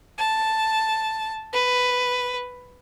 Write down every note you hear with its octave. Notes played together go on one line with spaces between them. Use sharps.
A5
B4